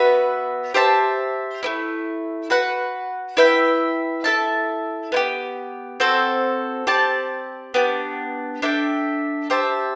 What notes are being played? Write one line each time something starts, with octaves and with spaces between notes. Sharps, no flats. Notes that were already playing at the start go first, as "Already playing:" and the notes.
Already playing: B3 F#4 B4 E5
G4 C5 E5 A5
A3 C4 E4
F#4 B4 F#5
E4 B4 E5 G5
E4 A4 E5 A5
B3 E4 G4
C4 F#4 A4 C5
C4 G4 D5 A5
B3 D4 G4
D4 A4 E5 G5
G4 C5 E5 A5